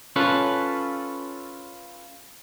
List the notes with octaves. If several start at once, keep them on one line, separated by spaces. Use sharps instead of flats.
C#4 F4 A4 B4